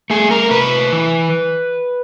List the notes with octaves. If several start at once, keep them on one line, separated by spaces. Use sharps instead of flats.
A3 G#4
A#4
C3 B4
E3